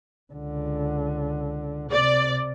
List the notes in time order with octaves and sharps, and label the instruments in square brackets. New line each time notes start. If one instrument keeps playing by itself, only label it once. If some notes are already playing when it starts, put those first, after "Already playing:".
[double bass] C#2 D3
[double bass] C3 [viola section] D5